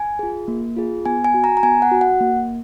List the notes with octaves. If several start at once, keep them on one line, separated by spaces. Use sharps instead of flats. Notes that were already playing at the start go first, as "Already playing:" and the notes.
Already playing: G#5
F4 G#4
A#3
F4 G#4
B3 G#5
G#5
F#4
A#5
A#5
B3 G#5
F#5
F#4
F#5
A#3